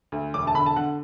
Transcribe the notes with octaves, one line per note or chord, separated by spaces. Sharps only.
D2
E1 D6
A5
D3 B5
A5
D3 F#5